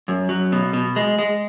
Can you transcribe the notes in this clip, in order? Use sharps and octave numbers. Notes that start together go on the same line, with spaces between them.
F#2
F#3
B2
B2
G#3
G#3